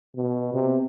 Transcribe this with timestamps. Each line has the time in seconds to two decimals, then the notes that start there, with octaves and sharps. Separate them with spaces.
0.16 B2
0.54 C3